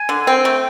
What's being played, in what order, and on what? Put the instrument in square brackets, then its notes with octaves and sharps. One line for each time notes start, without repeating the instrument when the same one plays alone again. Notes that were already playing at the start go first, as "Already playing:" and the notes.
Already playing: [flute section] G#5
[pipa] D3
[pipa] C4 [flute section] G5
[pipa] A3